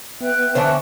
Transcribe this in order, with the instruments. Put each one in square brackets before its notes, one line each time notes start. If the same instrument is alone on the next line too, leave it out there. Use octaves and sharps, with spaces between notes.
[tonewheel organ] B3 [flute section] E5 G5 F#6
[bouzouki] D3 E3 C#5 [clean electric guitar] C5 A5